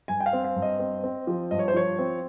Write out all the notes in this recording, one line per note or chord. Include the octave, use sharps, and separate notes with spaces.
G2 G#5
G5
F5
C4
F5
G2
D#5
C4
C4
F3
G2 D#5
C#5
C5
F3 C#5
C4